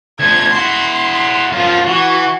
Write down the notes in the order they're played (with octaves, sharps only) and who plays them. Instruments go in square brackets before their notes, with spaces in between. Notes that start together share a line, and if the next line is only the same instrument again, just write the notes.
[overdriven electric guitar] D2 F3 [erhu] G#6
[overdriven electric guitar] E4 F#4 [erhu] C6
[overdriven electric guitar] F#2 F3 [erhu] F4
[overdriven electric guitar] E3 [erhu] F#4